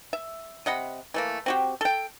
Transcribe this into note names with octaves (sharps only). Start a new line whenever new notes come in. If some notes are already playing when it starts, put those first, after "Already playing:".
E5
C3 D#5 F#5 B5
E3 A3 A#3
C4 F#4 G4
A4 G5